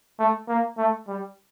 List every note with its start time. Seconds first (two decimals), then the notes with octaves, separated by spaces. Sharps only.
0.19 A3
0.48 A#3
0.78 A3
1.08 G3